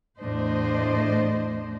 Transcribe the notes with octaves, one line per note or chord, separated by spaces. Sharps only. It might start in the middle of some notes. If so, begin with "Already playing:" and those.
E2 A2 D4 C5 D#5